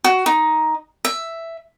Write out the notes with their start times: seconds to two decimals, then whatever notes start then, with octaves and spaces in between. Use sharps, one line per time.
0.04 F#4
0.26 D#4
1.05 E5